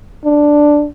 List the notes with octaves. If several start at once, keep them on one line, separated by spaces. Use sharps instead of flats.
D4